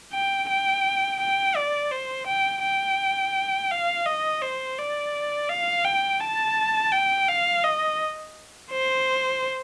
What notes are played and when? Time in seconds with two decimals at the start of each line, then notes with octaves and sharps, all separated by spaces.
0.13 G5
0.49 G5
1.20 G5
1.56 D5
1.91 C5
2.27 G5
2.63 G5
3.71 F5
4.06 D#5
4.42 C5
4.78 D5
5.49 F5
5.85 G5
6.21 A5
6.93 G5
7.28 F5
7.64 D#5
8.71 C5